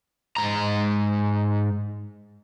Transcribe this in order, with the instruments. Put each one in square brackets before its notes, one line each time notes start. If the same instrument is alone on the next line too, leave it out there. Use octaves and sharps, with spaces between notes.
[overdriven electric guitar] G#2 A#5